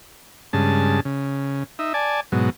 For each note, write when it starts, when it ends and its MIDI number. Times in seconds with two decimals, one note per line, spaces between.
0.53 1.00 43
0.53 1.00 49
0.53 1.00 56
0.53 1.00 81
1.05 1.64 49
1.79 1.93 63
1.79 1.93 76
1.94 2.21 74
1.94 2.21 80
1.94 2.21 81
2.32 2.50 44
2.32 2.50 47
2.32 2.50 54